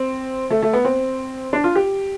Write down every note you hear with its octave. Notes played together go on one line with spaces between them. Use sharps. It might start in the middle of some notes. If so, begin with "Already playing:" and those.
Already playing: C4
A3
A3
B3
C4
D4
F4
G4